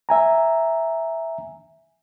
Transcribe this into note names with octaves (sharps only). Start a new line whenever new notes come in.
E5 G#5 A#5